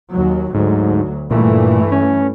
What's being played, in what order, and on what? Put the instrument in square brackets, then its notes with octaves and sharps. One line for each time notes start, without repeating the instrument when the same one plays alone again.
[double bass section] D#2 F#3
[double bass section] D2 F#3 [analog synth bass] G#2
[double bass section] G2 E3 A3 [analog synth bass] A#2
[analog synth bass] C#4